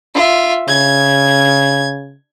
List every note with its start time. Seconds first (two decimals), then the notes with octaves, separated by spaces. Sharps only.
0.14 F4 E5
0.68 C#3 G#6